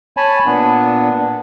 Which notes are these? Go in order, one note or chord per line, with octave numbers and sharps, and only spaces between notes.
C#5 G#5 A5 B5
A#2 B3 D4